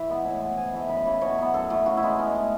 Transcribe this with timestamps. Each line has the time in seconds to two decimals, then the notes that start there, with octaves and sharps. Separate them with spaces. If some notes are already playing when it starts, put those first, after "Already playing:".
Already playing: E3 E5
0.08 G#3 B3
0.24 A2 G#5
0.41 G#3 B3
0.57 G#2 G#5
0.73 E3 A3
0.89 F#2 B5
1.06 C#3 E3
1.21 B2 C#5
1.38 F#3 B3
1.54 F#2 A4
1.70 E3 A3
1.86 C#3 F#4
1.97 E4
2.03 G#3 B3 D#4
2.19 B2 C#4
2.35 A3